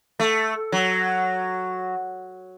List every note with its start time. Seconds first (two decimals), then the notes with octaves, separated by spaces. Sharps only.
0.20 A3
0.72 F#3